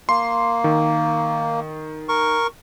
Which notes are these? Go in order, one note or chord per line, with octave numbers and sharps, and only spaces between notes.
A#3 C6
D#3
A#4 C#6